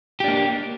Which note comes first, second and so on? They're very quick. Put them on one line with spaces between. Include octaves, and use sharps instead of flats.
G4 D4 A#3